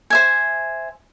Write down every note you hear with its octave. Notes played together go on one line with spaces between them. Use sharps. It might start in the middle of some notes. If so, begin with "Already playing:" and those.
C5 E5 G#5